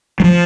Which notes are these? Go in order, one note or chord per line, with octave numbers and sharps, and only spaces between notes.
G3
F3